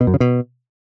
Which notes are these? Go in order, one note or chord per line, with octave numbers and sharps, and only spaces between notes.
B2
F#2
C#3
B2